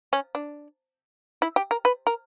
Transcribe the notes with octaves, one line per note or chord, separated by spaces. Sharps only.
C#4
D4
E4
G4
A#4
B4
A#4